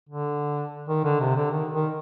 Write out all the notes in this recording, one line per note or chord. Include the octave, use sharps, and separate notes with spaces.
D3
D#3
D3
C3
D3
D#3
D#3